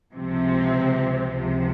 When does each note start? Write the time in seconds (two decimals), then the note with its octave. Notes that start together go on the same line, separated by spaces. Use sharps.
0.13 C#2 C3 F3 C4
1.31 C#2 C3 F3